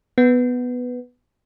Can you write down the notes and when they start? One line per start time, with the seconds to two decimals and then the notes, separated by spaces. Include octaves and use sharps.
0.18 B3